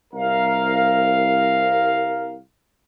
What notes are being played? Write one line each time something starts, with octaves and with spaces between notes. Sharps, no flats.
C2 A#4 F5